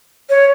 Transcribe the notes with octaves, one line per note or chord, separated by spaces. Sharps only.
C#5